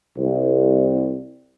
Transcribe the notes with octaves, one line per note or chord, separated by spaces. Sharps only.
C2